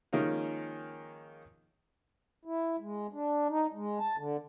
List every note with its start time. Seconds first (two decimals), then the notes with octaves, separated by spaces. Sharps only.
0.13 D#3 F3 G#3 A#3 C#4 D#4
2.45 E4
2.80 G#3
3.13 D4
3.50 D#4
3.74 G#3
3.99 A5
4.17 D3